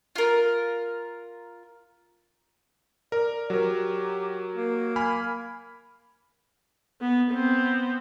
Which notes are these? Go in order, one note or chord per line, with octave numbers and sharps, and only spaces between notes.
F4 A#4
A#4 D5
F#3 G4 A#4
A#3
G#5 B5 F6
B3
B3 C4